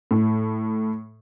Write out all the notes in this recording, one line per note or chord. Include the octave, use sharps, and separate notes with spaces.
A2